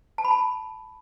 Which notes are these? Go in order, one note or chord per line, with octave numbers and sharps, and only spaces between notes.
A5
B5
A5